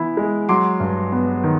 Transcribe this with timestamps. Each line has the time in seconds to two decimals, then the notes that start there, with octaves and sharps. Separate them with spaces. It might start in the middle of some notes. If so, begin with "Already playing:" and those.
Already playing: E3 B3 E4
0.17 G#3
0.49 F#3 C6 D6
0.80 G2
1.12 B3
1.44 D#3